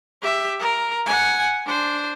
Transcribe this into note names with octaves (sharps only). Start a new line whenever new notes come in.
G4 E5
A#4
F#5 G#5
D4 C5